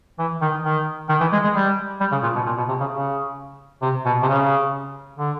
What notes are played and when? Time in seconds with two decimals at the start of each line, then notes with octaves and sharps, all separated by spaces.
0.19 E3
0.41 D#3
0.64 D#3
1.09 D#3
1.21 E3
1.32 G#3
1.44 G#3
1.55 G3
2.00 G3
2.12 C#3
2.23 A#2
2.35 B2
2.46 A#2
2.57 B2
2.68 C3
2.80 C#3
2.91 C#3
3.82 C3
4.05 B2
4.23 C3
4.28 C#3
5.18 D3